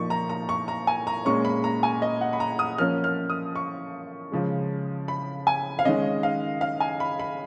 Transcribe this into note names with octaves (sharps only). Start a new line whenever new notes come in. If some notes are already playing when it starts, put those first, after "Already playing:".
Already playing: A#2 F3 A#3 D#4 C#6
A#5
A#5
C#6
A#5
G#5
A#5
A#2 G#3 C#4 C#6
B5
A#5
G#5
D#5
F#5
B5
A#5
D#6
F3 A#3 C#4 F6
F6
D#6
C#6
C#3 F3 G#3
B5
G#5
F5
D#3 G#3 C#4 D#5
F5
F5
G#5
B5
B5